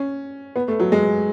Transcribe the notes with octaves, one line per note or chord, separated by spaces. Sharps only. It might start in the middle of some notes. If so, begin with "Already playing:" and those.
Already playing: C#4
B3
A3
F#3
G#3